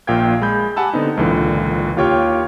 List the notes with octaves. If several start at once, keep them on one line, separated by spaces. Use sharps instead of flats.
A#1 A#2 F5 G5 G#6
G#3 B5 G6
G4 F#5 G#5 A5 B5 E6
D3 B3 C4 D#4
G#1 C#2 A#2 D3 E3
D#2 F4 G4 C#5 G5 F6